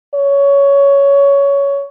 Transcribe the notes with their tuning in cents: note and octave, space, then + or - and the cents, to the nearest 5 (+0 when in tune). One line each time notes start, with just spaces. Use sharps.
C#5 +15